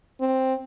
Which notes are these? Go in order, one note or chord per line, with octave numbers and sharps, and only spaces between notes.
C4